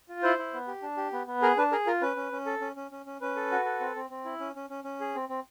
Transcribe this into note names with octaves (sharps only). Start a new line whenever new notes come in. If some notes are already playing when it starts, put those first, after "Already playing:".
F4
E4 C5
E4
B3
G4
D4
G4
B3
B3
G#4 A#4
D4 B4
G#4 A#4
F4 A#4
C#4 B4
C#4
C#4
A4
C#4
C#4
C#4
C#4
C#4 B4
A4
F#4
A4
C4
C4
C4
E4
C#4
C#4
C#4
C#4
G#4
C4
C4